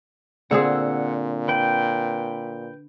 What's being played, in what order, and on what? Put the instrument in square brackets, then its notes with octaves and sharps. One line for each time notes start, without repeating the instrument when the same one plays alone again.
[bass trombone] A#2 [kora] D3 C4 G#4 [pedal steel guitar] F#5 E6
[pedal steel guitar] B4 G5